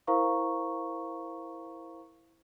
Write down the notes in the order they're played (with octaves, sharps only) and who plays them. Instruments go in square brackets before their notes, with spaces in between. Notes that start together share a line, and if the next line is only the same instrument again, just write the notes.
[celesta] E4 A#4 C5 F5 A#5 C#6